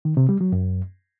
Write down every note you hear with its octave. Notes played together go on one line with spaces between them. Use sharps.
D#3
C3
G3
F#3
F#2